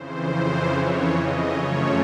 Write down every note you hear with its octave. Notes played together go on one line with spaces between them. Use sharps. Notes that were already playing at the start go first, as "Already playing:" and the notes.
Already playing: F2 C#3 E3 C5
C#5
D#5
F#2 C#3 F3 A3 C#5